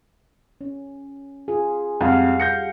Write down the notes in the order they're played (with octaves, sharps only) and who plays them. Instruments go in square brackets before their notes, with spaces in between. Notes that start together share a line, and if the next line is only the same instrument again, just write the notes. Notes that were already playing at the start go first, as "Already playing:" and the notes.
[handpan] C#4
F4 G#4
[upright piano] F2 G#2 [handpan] G3 F5 F#5
[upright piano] G6 A#6 C#7